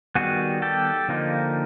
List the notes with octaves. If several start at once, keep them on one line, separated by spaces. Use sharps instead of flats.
D#3 G3 B3 F#4 G#4
G4 A4
D3 F3 A#3 D#4